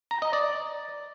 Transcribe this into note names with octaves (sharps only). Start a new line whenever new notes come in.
A#5
D#5
D5